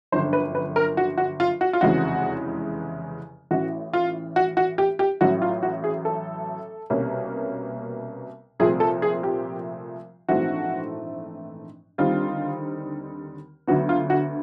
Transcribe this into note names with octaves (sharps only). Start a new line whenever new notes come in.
G1 F#2 D3 F3 C5
B4
B4
A#4
F#4
F#4
F4
F#4
F4
F1 E2 C#3 E3 G#3 F#4
A1 A2 E3 F#4
F4
F#4
F#4
G4
G4
A1 A2 F#3 F#4
F4
F#4
G#4
A4
C2 B2 G3 A#3 C#4
C2 A#2 F3 A3 C4 G#4
A4
G#4
G4
A#1 G#2 E3 A3 C4 F#4
D#2 D3 G3 C4 D#4 F4
D2 D3 F#3 B3 F#4
F4
F#4